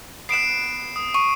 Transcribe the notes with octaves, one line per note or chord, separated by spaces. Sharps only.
B3 F#6 C7 D7 E7
D#6
C#6 D#7